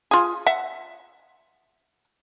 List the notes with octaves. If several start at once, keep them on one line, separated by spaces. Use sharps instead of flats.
F4 G#4
E5 F#5